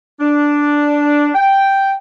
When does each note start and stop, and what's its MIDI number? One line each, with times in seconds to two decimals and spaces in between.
0.20 1.29 62
1.35 1.93 79